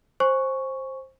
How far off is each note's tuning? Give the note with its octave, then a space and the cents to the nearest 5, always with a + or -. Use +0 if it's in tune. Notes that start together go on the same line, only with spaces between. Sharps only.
C5 +15 G#5 +0 C#6 +0